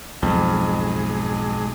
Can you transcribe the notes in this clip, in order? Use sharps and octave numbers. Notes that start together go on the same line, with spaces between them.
B1 F2 G#2 G#3